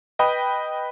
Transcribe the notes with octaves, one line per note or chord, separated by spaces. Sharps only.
B4 D#5 G5 B5 D#6